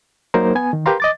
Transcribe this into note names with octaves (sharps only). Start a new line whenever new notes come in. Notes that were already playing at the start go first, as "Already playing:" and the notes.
F#3 A#3 D#4 A#4 C5
B3 G#5
D#3
G4 A#4 B4 F5 A#5 C6
D#5 D6 A6